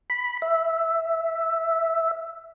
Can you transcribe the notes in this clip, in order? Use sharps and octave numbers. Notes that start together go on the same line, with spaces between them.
B5
E5